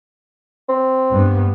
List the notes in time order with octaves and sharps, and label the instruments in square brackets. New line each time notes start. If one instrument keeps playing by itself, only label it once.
[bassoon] C4
[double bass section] G2 B3